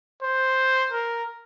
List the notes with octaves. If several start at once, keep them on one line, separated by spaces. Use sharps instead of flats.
C5
A#4